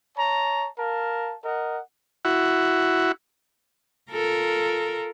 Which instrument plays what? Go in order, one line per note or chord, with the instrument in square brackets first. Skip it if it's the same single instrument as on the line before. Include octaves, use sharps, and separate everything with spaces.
[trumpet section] C#5 A5 A#5
A#4 F5 A5
A#4 D#5 F#5
[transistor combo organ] E4 F#4
[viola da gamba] F4 A4 A#4